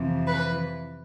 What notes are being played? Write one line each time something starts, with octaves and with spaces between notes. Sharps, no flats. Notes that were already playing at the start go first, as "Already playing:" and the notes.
Already playing: F2 C3 E3
B4